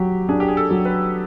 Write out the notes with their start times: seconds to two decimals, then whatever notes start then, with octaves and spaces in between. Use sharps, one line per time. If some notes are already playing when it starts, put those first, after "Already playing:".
Already playing: F#3 G4
0.29 D4 G#4
0.40 G4
0.48 G#4
0.57 A4
0.71 F#3
0.85 B4